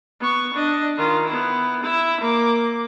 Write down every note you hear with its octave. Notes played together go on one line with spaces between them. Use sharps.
B3 C#6
D4 D#5
D#3 F4
B3 E4
E4 E5
A#3 D6